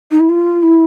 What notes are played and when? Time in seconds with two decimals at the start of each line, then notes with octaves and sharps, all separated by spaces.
0.11 D#4
0.20 E4
0.29 F4
0.62 E4